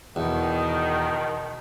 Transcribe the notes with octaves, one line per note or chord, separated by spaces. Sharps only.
E2 B2 D#3